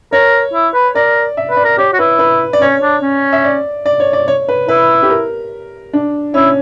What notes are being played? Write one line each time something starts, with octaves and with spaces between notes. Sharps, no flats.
A#4 C#5
E4
B4
A#4 D5
E5
B4
D5
A#4
G4 C#5
F#4
E4 B4
B4
D5
C#4 C#5
D4
C#4
E5
D5
D5
C#5
D5
C#5
B4
E4 B4
G4
A#4
D4
C#4 E4